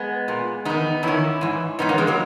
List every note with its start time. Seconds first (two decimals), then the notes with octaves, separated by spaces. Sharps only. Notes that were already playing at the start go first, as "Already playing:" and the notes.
Already playing: G#3 B3
0.28 A#2
0.65 E2 D#3 B3 D#4
1.03 E2 D#3 C#4 E4
1.41 G#2 E3
1.79 G#2 E3 B3 D#4
1.89 A#3 C#4
1.98 G#3 B3
2.07 F#3 A#3